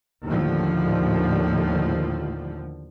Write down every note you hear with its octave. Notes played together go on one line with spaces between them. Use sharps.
D#2 A2 D3 F3